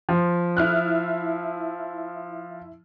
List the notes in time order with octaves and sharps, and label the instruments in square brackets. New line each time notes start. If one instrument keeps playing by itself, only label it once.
[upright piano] F3
[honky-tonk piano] E4 F6 F#6